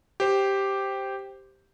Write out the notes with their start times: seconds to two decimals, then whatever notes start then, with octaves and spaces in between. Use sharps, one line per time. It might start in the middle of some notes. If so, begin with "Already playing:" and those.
0.20 G4 C5